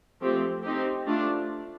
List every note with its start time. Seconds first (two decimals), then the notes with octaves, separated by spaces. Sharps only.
0.21 F3 A3 C4 G4
0.63 C4 D#4 G4
1.06 A3 D4 F4